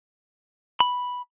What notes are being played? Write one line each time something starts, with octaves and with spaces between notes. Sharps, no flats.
B5